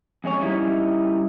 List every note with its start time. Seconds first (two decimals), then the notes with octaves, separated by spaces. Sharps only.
0.24 F2 G#3 C#4 C#5
0.41 G3 C#4 D#4 E4